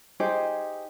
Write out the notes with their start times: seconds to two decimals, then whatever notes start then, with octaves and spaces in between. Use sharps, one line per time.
0.20 D#4 G4 G#4 C5